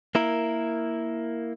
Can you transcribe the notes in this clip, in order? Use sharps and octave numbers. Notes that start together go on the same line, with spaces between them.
A#3 E4 A#4